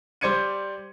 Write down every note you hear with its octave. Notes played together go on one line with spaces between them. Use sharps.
G3 C5 D5 G#6 C#7 D#7